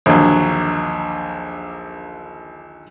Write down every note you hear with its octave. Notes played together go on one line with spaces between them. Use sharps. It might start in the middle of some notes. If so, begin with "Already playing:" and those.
A#1 D#2 D3 F#3